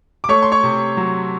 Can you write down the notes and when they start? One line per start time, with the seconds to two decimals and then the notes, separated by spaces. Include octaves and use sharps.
0.24 D6
0.29 A3 C#5 C#6
0.43 C6
0.52 C#5 C#6
0.63 C3
0.97 F#3